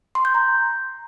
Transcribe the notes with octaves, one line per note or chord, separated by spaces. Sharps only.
C6
G6
A#5